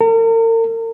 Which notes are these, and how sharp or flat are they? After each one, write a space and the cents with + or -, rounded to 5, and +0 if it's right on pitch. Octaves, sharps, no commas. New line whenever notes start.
A#4 -45